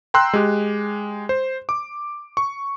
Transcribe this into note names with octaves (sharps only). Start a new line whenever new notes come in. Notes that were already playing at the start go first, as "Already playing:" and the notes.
G5 A#5 C6 E6 F#6
G#3 G4
C5
D6
C#6